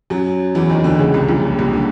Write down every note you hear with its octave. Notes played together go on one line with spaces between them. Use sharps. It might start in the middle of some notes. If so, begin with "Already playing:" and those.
F#2 F#3
E2 E3
D#2 D#3
D2 D3
C#2 C#3
C2 C3
A#1 A#2
C2 C3
D3